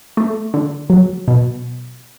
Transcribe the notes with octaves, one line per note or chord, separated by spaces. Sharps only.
A3
D3
F#3
B2